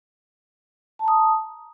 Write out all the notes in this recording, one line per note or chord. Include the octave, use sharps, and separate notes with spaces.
A5 A#5 D#6